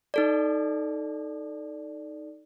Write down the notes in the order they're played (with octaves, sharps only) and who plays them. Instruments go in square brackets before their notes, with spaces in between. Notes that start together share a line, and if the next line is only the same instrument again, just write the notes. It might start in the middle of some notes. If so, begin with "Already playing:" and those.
[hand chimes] D#4 A4 D5